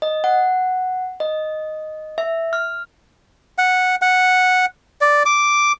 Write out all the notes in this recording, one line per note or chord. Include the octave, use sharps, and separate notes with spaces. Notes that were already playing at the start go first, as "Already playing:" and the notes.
D#5
F#5
D#5
E5
F6
F#5
F#5
D5
D6